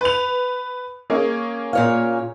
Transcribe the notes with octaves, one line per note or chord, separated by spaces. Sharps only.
B4 F7
A#3 C#4 G#4
A#2 C#5 F5